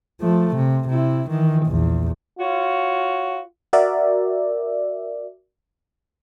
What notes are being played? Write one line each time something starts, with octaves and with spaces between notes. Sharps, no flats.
F3 A3
C3
C3 E4
D#3 E3
A#1 E2
F4 F#4 C#5
F#4 A#4 D5 E5